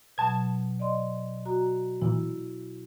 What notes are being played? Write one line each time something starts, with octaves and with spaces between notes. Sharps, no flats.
B2 F#3 A5 G#6
D5 D#5 C6
F#4 A#5
A#2 E3 E4